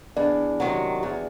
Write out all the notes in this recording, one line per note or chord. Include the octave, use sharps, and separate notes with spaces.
E2 D4
C3 D#3 F#3
E2